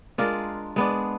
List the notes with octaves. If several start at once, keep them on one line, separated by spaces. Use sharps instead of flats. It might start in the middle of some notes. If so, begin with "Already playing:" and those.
G#3 D4 F4 A#4
G#3 B3 D4